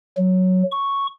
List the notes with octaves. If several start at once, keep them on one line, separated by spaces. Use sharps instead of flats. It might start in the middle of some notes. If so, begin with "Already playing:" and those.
F#3
C#6